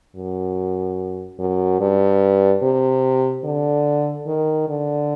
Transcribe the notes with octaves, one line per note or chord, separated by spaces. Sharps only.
F#2
F#2
G2
C3
D3
D#3
D3